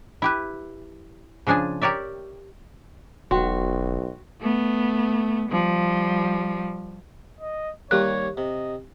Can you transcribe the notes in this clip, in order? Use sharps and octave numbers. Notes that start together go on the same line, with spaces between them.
E4 G4 B4
C#3 F3 D4 G#4 G#5
G4 A#4 C#5 D5 E5
E1 B1 F#4 G5 C6
A3 B3
F3 G3
D#5
D#3 G3 A#3 G4 C#5 F#6
C3 D#5